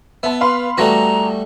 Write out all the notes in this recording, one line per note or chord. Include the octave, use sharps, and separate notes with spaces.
B3 E5 A5
B4 F5 B5 C6
E2 G3 A3 B3 F#4 A#5 A#6